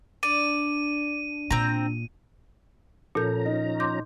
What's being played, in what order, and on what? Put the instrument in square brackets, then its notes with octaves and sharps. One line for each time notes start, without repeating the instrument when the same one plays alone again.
[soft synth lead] D4 [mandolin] D5 [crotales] D#7
[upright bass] A#2 [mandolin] C4 A#5
[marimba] A#2 G6 [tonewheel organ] F3 C#4 A#5 [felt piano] A4
[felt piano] D#4
[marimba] C6 D6 G6